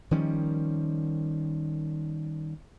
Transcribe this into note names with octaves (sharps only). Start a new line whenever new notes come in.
D#3 F3 G3 C#4